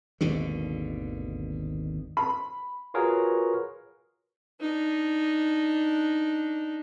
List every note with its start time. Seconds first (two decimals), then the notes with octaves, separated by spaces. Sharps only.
0.21 G#1 D#2 B2 D3
2.17 B5
2.94 F4 F#4 G#4 A#4 B4 C#5
4.61 D4 D#4